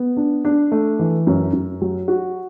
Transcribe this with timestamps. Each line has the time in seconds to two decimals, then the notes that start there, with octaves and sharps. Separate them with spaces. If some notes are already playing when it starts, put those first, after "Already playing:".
Already playing: B3
0.17 D4
0.45 D4
0.72 A3
0.99 E3
1.27 F#2
1.53 F#2
1.81 F#3
2.08 F#4